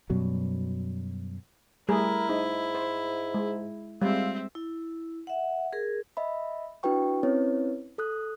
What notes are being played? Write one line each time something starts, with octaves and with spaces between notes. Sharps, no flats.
F#2 B2 F#3 G3
G3 A3 E4 G#4 A#4
G#2 D#4
C5
G#3
G3 G#3 C4 F4 E5
E4
E5 F#5
G#4 A#4
D#5 E5 B5
D4 E4 F#4 B4 G5 C#6
C4 C#4 E4 B4 C#5
A4 D#6 F#6